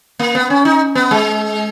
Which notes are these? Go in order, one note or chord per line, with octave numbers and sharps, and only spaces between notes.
A#3
B3
C#4
D#4
B3
G#3